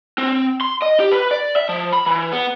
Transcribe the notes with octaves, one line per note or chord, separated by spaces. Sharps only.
C4
C6
D#5
G4
B4
D5
E5
F3
B5
E3
B3